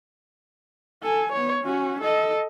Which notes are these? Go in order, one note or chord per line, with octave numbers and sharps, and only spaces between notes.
A4 G#5
B3 C#5
C#4 F#4
A4 D#5